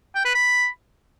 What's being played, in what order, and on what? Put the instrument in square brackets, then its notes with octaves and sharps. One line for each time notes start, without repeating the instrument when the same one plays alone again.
[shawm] G5
B4
B5